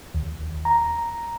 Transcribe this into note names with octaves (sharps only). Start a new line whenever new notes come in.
D#2
A#5